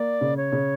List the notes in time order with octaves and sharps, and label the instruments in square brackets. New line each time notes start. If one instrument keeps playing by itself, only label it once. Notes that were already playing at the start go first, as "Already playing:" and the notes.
Already playing: [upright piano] A#3 [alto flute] D5
[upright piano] C#3
[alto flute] C#5
[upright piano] C#3